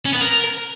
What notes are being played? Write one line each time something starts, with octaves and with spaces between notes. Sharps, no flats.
C#4
B3
A#4